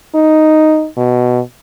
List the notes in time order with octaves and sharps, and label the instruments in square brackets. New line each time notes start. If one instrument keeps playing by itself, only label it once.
[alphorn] D#4
B2